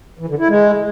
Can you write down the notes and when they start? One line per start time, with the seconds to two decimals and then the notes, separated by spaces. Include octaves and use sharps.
0.19 E3
0.29 D3
0.39 E4
0.48 G#3